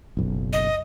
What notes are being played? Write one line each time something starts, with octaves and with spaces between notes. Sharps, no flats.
F#1 B1
D#5